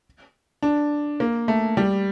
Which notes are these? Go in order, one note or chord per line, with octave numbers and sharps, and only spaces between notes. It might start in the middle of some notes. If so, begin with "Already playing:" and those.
D4
A#3
A3
G3